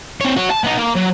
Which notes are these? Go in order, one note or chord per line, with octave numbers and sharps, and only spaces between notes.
C4 C#5
F#4 C#5
A5
B3 D#4
A#3
F#3